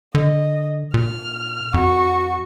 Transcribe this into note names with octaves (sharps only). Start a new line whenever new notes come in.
D3 D#5
A#2 F6
F2 F#4 C#6